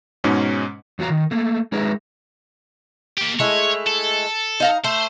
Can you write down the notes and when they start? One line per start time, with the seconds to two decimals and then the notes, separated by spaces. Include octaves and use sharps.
0.24 G#2 B2 G#3 C#4 D#4
0.99 E2 F#3 F#4 F5 A#5
1.10 D#3
1.31 A3 A#3
1.72 G#3 D#4 G#4 A#4 B4 E5
3.18 A#3 G4
3.40 G#3 A3 E4 C#5
3.87 A4
4.60 D#4 F5 A#5
4.84 A3 C5 C6